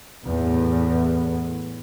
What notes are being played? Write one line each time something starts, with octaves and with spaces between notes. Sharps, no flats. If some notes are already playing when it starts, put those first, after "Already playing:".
E2 A2